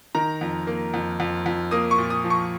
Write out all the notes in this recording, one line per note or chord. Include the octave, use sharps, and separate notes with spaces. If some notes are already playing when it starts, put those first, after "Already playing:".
D#3 A#5
F2
A#3
F2
F2
F2
A#3 D#6
C#6
A#2
D#6
F3
C#6